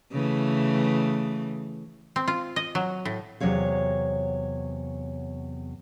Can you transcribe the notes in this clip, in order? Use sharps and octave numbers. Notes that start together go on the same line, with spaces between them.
C#3 E3 A3
C4
F4
D#5
F#3
A2
E2 C3 F#3 C#5 F5